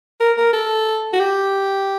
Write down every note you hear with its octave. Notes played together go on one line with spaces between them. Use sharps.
A#4
A#4
A4
F#4
G4